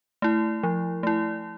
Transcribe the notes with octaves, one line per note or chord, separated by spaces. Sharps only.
A3 E4
F3
A3 E4